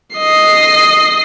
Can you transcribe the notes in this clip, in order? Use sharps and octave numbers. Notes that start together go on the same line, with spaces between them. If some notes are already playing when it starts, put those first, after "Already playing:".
D#5 C7